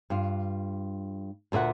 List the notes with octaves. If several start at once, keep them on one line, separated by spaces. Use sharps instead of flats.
G2 F4
D2 A#2 A4 E5 F#5